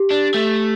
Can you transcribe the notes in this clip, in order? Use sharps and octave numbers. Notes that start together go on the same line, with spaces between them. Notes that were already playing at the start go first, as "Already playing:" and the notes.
Already playing: G4
D4
A3